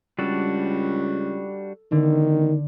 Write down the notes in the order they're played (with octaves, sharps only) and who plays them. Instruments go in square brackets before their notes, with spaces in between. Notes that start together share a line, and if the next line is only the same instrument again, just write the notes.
[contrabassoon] C#2 [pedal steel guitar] G3 D4 F#4 [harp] A4
[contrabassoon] E1 [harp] D3 [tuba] D#3